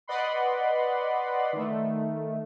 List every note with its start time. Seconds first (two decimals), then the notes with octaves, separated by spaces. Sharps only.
0.08 B4 D5 D#5 F#5 B5 C6
1.53 D#3 A3